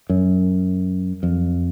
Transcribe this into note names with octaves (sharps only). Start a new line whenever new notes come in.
F#2
F2